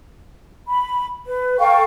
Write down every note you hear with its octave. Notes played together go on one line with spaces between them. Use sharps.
B5
B4
A4 F5 G5 C#6